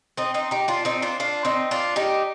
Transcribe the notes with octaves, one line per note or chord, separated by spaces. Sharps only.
C4 D#4
C4 D#4
D#4 G4
D4 F4
C4 D#4
D4 F4
D4 F4
C4 D#4
D4 F4
D#4 G4